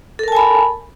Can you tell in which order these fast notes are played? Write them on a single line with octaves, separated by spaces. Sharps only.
A4 A#4 A5 G#5 B5